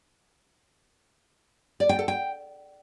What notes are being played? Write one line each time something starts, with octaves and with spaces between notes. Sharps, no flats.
D5
G5
A4
G5